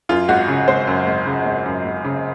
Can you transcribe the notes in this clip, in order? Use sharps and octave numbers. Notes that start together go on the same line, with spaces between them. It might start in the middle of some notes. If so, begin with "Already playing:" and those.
F#2 F4
G#1 F#4
C#3
G#1 C5
F#2
G#1
C#3
G#1
F#2
G#1
C#3